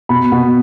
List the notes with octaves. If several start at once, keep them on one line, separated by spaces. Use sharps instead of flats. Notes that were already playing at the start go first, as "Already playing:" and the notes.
B2 B5
B2